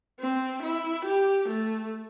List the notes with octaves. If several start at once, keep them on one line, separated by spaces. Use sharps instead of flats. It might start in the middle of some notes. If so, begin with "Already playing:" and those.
C4
E4
G4
A3